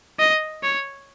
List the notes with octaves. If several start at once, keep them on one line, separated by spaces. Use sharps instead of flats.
D#5
C#5